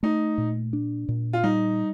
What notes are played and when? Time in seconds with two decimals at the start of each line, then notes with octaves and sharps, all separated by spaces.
0.03 A3 D#4
0.38 A#2
0.73 D4
1.09 A#2
1.33 F4
1.43 G3 D#4